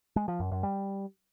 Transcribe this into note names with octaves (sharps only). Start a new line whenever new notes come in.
G#3
F3
F#2
F#2
G3